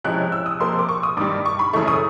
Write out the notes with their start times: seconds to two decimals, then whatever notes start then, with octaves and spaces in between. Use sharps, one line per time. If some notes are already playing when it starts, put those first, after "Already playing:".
0.04 C3 F3 G#3 C#4 E4 F#6
0.32 E6
0.46 D#6
0.60 C3 F3 A#3 C6
0.79 D6
0.89 C#6
1.03 D#6
1.17 G2 D#3 G3 D6
1.46 C#6
1.59 B5
1.73 F#2 C#3 E3 A3 C#6
1.88 D#6